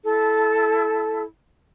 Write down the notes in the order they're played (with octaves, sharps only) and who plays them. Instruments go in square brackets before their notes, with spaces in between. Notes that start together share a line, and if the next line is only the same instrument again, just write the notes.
[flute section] E4 A4 A5